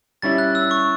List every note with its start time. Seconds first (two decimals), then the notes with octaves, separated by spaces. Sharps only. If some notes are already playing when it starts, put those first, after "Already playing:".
0.22 G3 C#4 E4 A6
0.38 F#6
0.55 E6
0.71 C#6